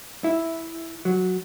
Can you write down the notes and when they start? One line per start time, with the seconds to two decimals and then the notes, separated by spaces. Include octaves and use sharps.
0.24 E4
1.05 F#3